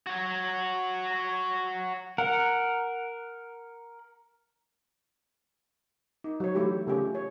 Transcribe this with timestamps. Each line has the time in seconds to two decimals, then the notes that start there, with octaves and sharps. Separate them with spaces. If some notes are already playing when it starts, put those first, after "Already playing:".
0.06 F#4 C#5
2.18 A#4 F#5
6.24 D#4
6.40 F#3 C#5
6.55 E3 F#3 A3 E4 G4
6.87 C#3 A3 C#4 F4 G4 G#4
7.15 C#5